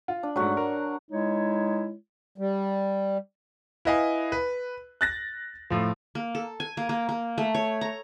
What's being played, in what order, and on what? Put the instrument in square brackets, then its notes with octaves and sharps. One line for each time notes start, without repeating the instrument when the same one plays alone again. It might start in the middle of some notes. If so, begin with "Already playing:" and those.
[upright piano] F4
[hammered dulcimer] D4
[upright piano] G#2 A3 [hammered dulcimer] F#3 F#4
[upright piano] A#4
[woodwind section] G#3 D#4 E4 C#5
[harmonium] G3
[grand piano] E4 B4 D#5 F5 G#5
B4
F#6 A6 A#6
A2 F3
[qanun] A#3
A4
G#5
A#3
A#3
A#3
A3
C#5
A#5